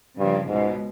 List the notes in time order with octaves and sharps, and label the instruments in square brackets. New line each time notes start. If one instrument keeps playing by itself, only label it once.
[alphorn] G2 [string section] C#3 F3 A#3
[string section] C#2 B2 G#3 [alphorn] G#2